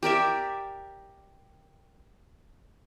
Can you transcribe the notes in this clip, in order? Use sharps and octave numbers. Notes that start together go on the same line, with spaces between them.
G4 A#4 D5 E5